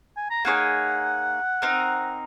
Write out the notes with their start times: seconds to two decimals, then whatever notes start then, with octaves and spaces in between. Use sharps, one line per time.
0.17 G#5
0.30 A#5
0.45 A#3 D#4 G#4 C#5 F#5
1.62 C4 D#4 A#4